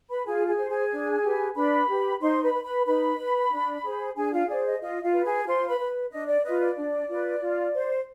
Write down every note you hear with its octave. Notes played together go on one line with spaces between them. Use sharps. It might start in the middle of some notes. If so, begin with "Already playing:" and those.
B4 B5
F4 G#4 G#5
G#4 G#5
C5
G#4 G#5
D4
G4 B4
D4 B4 B5
G4 B4
D#4 C5 C6
B4 B5
B4
B4 B5
D#4 B4 B5
B4
D4
G#4 C5
D4 G#4 G#5
F4 F5
G#4 C5 D5
D#5
F4 D#5
F4 F5
B4
G#4 G#5
F4 C5 C6
B4 B5
B4
D4 D#5
D5
F4 B4 D#5
D5
D4
F4 B4
F4
C5